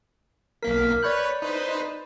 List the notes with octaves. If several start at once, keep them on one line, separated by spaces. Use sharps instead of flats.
B1 A#3 A#4 B6
B4 C#5 D5 B5 F#6 G6
D#4 B4 C5